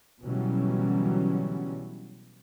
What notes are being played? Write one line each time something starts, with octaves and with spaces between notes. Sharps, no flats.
B2 D3 E3 F#3 G3 C#4